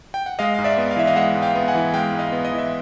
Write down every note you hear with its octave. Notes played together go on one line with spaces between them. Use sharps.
G5
F#5
G#3 D#5 F5
G#2 F5
D5 E5
B3
F5
E3 E5
D#5 F5
G#3 E5 F#5
G#2
F5 G5
B3
F#5 G#5
E3
G#3 F5 G5
G#2
D#5 F5
B3
D#5
E3
E5